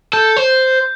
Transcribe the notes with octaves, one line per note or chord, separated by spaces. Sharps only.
A4 G6
C5